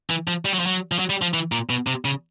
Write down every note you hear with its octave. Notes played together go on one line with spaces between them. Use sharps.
E3
F3
G3
F#3
F3
F#3
F3
F#3
G3
F3
E3
A#2
B2
C3
C#3